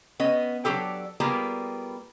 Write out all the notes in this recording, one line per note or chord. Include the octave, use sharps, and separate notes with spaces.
B3 C#4 D#5
F#3 D4 F4 G4 A4
G3 A#3 B3 F4 G4 G#4